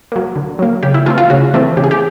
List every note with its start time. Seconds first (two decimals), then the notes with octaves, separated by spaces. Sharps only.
0.12 F#3 A#3
0.36 D3
0.59 F#3 A#3
0.83 C#3 G4
0.94 E4
1.06 E3 A3 C4 F4
1.18 F4
1.30 C#3 F#4
1.54 E3 A3 C4
1.77 C#3 G4
1.84 G#4
1.91 G4